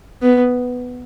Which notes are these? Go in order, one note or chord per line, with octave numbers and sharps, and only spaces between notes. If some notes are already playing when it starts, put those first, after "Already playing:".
B3